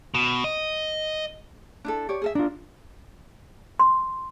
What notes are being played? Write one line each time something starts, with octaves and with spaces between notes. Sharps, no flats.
B2
D#5
D4 E4 A4
G4 C#5 D5
G#4 A4 E5
D4 F4 A#4
C6